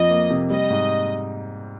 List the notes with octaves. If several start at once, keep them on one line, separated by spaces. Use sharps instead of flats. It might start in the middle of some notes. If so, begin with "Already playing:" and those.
Already playing: F2 F3 D#5
A#3
C3
G3 D#5
G#2